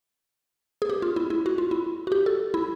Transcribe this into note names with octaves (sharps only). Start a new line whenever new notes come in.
G#4
G4
F4
E4
E4
F#4
F4
E4
F#4
G4
A4
E4